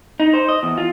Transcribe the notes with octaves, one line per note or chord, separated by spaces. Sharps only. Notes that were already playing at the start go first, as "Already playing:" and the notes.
D#4
C5
D#5
E2
F4